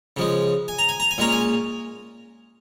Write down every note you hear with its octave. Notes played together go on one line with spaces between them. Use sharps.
C#3 F3 G#3
G#5
A#5
G#5
A#5
G#5
A#2 G#3 C#4 A#5
G#5